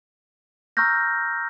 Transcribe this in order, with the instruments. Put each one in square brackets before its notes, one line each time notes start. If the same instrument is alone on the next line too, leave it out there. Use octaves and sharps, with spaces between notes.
[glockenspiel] A#5 C#6 E6 F6 G6 A#6